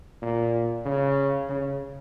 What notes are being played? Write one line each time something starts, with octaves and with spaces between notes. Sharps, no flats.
A#2
C#3
C#3